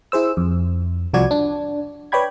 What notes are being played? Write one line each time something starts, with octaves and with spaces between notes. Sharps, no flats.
E4 G#4 C5 E6
F2
C2 F3 F#4 D5 G#6
D4
B4 C#5 D5 G5 B5 G#6